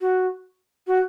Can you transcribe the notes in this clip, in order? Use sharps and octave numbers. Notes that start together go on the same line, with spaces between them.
F#4
F#4